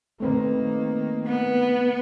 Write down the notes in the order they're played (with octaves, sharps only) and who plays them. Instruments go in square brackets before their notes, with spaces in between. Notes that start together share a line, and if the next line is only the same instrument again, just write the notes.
[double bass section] D#3 A#3 [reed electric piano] A3 C4 B4
[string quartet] B3